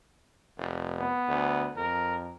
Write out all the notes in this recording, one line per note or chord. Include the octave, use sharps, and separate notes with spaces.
F1
B3
D2
F2 A#4